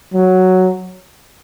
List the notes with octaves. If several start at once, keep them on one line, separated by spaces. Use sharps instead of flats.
F#3